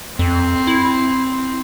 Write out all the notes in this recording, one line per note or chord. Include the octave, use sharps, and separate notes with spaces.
F2 C4
E4